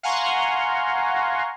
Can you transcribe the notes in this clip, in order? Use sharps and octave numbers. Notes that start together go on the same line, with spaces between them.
F5 F#5 G#5 A#5 C6 C#6